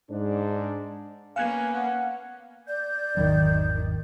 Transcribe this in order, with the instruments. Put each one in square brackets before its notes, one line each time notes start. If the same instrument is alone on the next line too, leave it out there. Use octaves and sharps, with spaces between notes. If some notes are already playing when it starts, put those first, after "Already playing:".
[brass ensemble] G#2 D4
[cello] A#3 C#4 [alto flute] B3 [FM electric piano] F5 F#6 G#6 [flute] G#5
[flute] F#5
[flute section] D5 G6
[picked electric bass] G#1 E2 F#3 [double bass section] D#3